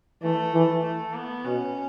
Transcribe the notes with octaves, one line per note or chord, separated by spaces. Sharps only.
E3 A3
E3
A3
B3
B2 C#4